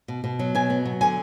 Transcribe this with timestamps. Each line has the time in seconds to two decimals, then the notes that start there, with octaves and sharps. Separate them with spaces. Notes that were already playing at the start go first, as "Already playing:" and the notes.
0.08 B2
0.24 B2
0.39 F#3
0.55 B2 G#5
0.70 B3
0.85 F#3
1.01 D3 G#5